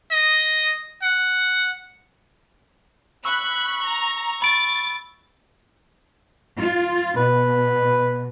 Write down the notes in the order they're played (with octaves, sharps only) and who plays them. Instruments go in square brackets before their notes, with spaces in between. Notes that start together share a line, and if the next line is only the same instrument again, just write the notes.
[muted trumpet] D#5
F#5
[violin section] B5 F#6 [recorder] C#6 [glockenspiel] E6
[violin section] A#5
[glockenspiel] B5 D7 [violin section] A6
[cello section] F4
[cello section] B2 [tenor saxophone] B4